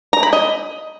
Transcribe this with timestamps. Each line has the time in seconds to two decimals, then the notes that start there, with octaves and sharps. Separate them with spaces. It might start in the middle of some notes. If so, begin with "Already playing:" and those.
0.13 A#5
0.23 B5
0.33 D#5